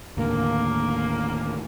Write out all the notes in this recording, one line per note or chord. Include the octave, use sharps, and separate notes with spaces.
D#2 A2 D3 A#3